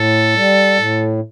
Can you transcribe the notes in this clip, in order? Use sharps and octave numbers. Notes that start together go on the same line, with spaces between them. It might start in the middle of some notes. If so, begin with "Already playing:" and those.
Already playing: A2 A4
G3
A2